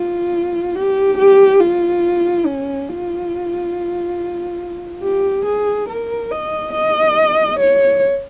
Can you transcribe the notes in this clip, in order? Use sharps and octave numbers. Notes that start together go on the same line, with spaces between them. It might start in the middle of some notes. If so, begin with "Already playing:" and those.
Already playing: F4
G4
G4
F4
C#4
F4
G4
G#4
A#4
D#5
D#5
C#5